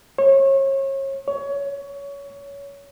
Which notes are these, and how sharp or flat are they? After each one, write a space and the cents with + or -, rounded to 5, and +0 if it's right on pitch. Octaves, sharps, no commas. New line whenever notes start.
C#5 -35
C#5 +20